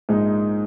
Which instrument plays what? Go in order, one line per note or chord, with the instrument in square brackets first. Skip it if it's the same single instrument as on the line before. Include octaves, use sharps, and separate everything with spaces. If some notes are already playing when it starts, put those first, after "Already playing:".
[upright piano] A#1 G#2 G#3 D#4